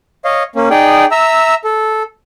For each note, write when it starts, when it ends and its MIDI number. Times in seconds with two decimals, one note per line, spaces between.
0.25 0.43 73
0.25 0.43 75
0.25 0.43 77
0.55 0.69 58
0.55 0.69 61
0.70 1.06 63
0.70 1.06 68
0.70 1.06 74
0.70 1.06 79
1.11 1.55 76
1.11 1.55 82
1.11 1.55 88
1.64 2.03 69